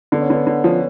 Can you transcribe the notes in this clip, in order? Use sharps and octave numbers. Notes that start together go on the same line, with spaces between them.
D3 B3
C#4
D3 B3
D3
F3 C#4